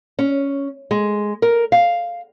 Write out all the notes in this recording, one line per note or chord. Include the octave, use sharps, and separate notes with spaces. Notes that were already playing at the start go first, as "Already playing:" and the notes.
C#4
G#3
A#4
F5